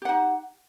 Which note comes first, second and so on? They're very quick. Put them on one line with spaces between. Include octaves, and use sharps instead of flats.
G4 F#5 D#4